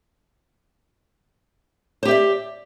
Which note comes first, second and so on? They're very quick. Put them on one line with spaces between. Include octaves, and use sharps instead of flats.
C5 G4 E5 D5